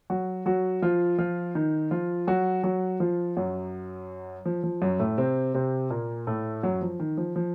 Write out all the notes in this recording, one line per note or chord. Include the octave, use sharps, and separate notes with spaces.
F#3 F#4
F#3 F#4
F3 F4
F3 F4
D#3 D#4
F3 F4
F#3 F#4
F#3 F#4
F3 F4
F#2 F#3
F3
F3
F#2 F#3
A2 A3
C3 C4
C3 C4
A#2 A#3
A2 A3
F#2 F#3
F3
D#3
F3
F3